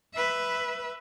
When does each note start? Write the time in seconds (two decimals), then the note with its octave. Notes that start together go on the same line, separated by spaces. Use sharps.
0.14 B4 E5